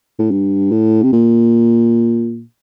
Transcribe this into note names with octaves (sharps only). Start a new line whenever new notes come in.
A2
G2
A2
C3
A#2